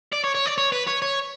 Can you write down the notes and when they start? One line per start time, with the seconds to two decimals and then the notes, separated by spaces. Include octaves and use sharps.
0.12 D5
0.24 C#5
0.35 C#5
0.46 D5
0.58 C#5
0.72 B4
0.87 C#5
1.02 C#5